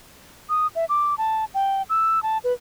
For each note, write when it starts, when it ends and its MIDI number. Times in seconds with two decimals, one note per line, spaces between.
0.49 0.67 87
0.76 0.85 76
0.89 1.15 86
1.18 1.45 81
1.54 1.82 79
1.90 2.22 88
2.23 2.38 81
2.44 2.53 71